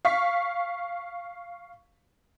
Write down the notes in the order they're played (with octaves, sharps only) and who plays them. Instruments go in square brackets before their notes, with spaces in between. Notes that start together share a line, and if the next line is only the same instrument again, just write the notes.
[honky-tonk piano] F5 C#6 B6